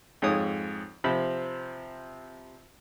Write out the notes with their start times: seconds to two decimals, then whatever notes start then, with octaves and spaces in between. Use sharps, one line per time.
0.22 F2 G#2 G#4 C#5 D#6
1.04 C3 F3 C4 B5